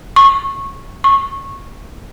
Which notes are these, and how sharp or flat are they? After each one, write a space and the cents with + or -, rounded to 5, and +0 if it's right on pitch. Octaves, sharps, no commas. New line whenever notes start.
C#6 -15
C#6 -15